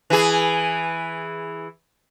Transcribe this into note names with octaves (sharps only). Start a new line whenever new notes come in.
E3 G#4